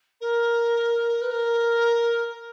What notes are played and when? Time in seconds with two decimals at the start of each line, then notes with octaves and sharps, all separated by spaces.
0.21 A#4
1.21 B4
1.31 A#4